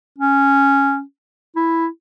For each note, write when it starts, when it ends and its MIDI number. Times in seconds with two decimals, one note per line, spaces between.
0.19 1.01 61
1.56 1.87 64